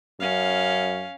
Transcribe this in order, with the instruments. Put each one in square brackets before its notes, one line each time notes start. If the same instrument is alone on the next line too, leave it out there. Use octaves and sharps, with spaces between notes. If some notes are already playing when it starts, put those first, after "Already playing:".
[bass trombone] F#2 [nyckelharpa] C#4 F5